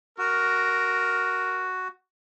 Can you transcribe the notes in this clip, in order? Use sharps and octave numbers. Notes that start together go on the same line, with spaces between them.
F#4 A#4